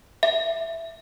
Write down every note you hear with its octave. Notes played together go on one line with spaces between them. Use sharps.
E5